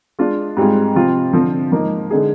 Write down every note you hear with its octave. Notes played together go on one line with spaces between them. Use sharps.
G#3 D4 F4
G#2 G3 C4 F4 G#4
C3 F3 C4 F4
D3 F3 C4 F4
G#2 F3 A#3 D#4
D3 G#3 D#4 G#4